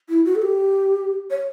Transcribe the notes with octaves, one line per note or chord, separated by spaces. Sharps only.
E4
F#4
A4
G4
C#5